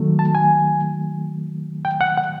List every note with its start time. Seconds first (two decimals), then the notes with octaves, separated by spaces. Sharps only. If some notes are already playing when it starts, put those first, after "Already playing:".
Already playing: D#3 F#3 A3
0.19 A5
0.35 G#5
1.85 G5
2.01 F#5
2.17 F#5